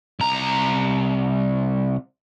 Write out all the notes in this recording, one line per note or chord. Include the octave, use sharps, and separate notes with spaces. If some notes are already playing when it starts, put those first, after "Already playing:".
C2 A#5